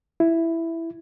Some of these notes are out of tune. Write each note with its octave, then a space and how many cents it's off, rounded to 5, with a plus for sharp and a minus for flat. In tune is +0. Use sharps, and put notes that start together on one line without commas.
E4 +5